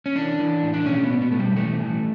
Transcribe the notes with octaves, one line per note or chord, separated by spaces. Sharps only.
C#4
E3 D4
E3
A2
D4
B2 C#4
B3
B2
B3
B2 A3
G3
E3 A3
E3